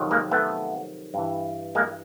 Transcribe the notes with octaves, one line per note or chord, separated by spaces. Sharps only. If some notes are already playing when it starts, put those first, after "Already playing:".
Already playing: F2 C3 D#3 F#3
G#3 A#3
A3 B3
G2 E3
G#3 A#3